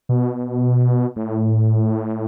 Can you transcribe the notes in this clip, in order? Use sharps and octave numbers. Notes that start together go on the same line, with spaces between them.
B2
A2